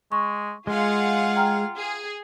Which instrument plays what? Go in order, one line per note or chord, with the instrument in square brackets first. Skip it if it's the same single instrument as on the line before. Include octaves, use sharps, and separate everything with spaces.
[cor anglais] G#3 [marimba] C#6
[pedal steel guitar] G#3 [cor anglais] F4 [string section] G#4 F5 F#5
[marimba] G5 A#5 F6
[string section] G#4